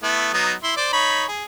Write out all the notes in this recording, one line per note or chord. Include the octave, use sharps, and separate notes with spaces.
A3 B3 E4
F#3 B3 D#4
E4 C6
C5 D5
D#4 C#5 B5
G#4